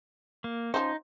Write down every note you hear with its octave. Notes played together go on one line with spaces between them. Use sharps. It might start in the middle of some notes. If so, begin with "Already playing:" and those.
A#3
F3 C#4 D#4 C5